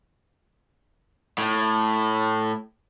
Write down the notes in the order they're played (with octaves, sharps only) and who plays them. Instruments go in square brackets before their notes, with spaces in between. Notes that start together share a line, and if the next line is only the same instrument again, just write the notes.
[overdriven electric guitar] A2